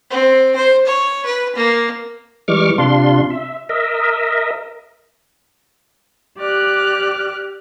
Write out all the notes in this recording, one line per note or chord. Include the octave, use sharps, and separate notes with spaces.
C4
C5
C#5
B4
A#3
E3 G3 G#3 C#6 D6 F6
C3 D4 F4 C6
E5
A#4 D#5 E5
G4 D5 F6 F#6